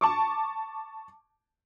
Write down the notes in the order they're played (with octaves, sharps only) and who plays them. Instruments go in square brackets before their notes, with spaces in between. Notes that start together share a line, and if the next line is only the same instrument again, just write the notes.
[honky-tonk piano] A5 C#6 D6